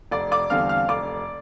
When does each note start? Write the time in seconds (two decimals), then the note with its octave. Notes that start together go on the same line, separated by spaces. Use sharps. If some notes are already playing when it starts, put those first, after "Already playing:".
0.11 F1 D5 D6
0.31 D5 D6
0.50 E2 D3 G3 C4 F5 F6
0.69 F5 F6
0.88 F1 D5 D6